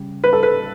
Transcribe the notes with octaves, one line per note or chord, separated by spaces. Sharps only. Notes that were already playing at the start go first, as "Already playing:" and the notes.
Already playing: C#3 G3
B4
A4
B4